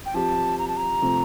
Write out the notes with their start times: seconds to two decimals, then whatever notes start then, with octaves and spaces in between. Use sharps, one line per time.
0.06 G5
0.14 F3 C4 G4 A5
0.58 A#5
0.68 A5
0.77 A#5
1.02 C3 F3 A3 C4